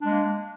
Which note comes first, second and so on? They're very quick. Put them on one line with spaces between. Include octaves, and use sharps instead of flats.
D4 G#3 A#3